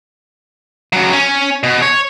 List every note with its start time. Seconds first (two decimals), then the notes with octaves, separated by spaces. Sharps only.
0.93 C#3 F#3
1.12 C#4
1.63 B2
1.82 C#5